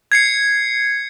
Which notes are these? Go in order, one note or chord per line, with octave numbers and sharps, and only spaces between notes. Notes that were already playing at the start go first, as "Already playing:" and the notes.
G#6 C7 C#7